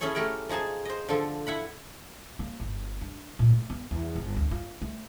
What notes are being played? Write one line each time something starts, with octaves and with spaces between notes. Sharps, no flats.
C#4 E4 G#4 A4 C#5
A3 G4 A#4 F#5 G5
F3 D#4 G#4 G#5 A5
C5 D#5
D3 F3 A4
E4 F#5 B5
A#3
G1
D4
A#2
A3
B3
E2
G1
D2
F4
A3